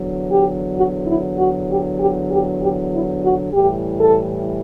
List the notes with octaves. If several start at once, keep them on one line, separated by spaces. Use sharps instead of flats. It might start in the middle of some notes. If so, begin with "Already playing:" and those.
Already playing: E2 D3 F#3
G4
F#4
E4
F#4
G4
G4
G4
G4
E4
F#4
A2 E3 G3 G4
A4